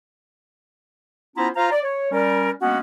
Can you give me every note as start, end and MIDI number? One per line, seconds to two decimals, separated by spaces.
1.37 1.49 59
1.37 1.49 61
1.37 1.49 64
1.37 1.49 65
1.37 1.49 72
1.37 1.49 82
1.56 1.70 65
1.56 1.70 72
1.56 1.70 77
1.56 1.70 82
1.72 1.82 74
1.83 2.10 73
2.11 2.51 55
2.11 2.51 61
2.11 2.51 70
2.62 2.80 56
2.62 2.80 58
2.62 2.80 59
2.62 2.80 61
2.62 2.80 62
2.62 2.80 66